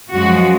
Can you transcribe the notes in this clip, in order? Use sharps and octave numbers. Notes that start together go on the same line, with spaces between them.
F#2 F3 G#3 F#4